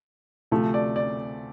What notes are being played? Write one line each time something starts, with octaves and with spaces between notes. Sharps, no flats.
D2 C3 F3 A3
D5
D5